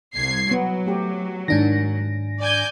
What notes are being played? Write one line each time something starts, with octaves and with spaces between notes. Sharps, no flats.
C2 G#6 C7
F#3 B3
A3 G4
G#2 D#3 D4 A#6
D5 G#5 G6